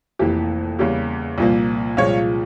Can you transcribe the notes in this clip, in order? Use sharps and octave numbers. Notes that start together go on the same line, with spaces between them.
F1 F2 E3 A#3 G4
E2 C#3 G3 A#3 G4
C2 A#2 F3 A#3
C2 A#2 F3 G#3 C#5 F5